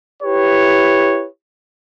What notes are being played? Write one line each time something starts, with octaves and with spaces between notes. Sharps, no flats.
E4 G4 B4 C#5